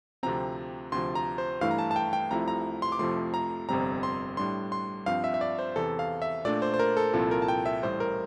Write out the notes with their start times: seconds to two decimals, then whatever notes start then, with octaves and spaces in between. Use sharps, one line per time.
0.23 D2 C3 F3 C4 A#5
0.92 D2 C3 F3 C6
1.15 A#5
1.38 C5
1.61 G2 E3 A3 E4 F5
1.71 A#5
1.78 A5
1.91 A5
1.96 G5
2.13 G5
2.30 C2 C3 F3 A3 E4 A#5
2.48 A#5
2.82 C6
2.92 D6
2.99 F2 C3 F3 A3 C6
3.34 A#5
3.69 G1 F2 C3 G3 C4 A#5
4.03 C6
4.37 A2 G3 D4 C6
4.72 C6
5.06 G2 F3 C4 F5
5.24 E5
5.34 E5
5.41 D5
5.59 C5
5.76 E2 C3 E3 A4
5.99 F5
6.22 E5
6.45 A#2 A3 D4 D5
6.62 C5
6.74 C5
6.79 A#4
6.97 A4
7.13 C2 A#2 F3 C4 E4 A4
7.31 A#4
7.42 A5
7.48 G5
7.66 E5
7.83 A1 A2 G3 C5
8.00 A#4